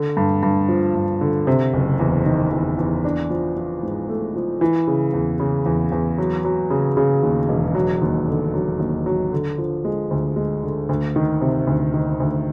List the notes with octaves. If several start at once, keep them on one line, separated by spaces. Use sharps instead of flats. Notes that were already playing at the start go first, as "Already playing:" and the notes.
Already playing: D3
G2
G2
F3
G2
D3
C3
F#1
E2
D#3
E2
E2
D4
F3
F3
G#2
A3
F3
E3
C#3
E2
C#3
E2
E2
F#3
F#3
C#3
C#3
D#2
E1
F#3
D#2
D3
F#3
D#2
F#3
D3
F3
G#3
D2
G#3
D3
D2
D#3
C3
D2
D#3
D2